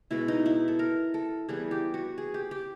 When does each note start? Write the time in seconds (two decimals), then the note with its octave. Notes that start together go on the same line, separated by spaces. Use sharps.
0.11 B2 G#3 B3 E4
0.28 D#4
0.46 E4
0.68 A4
0.79 A#4
1.14 A4
1.48 E3 G3 B3 G#4
1.71 G4
1.94 F#4
2.18 G#4
2.34 G4
2.51 G4